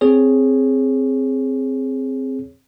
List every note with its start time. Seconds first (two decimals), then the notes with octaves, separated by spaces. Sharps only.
0.01 C4 G#4 C#5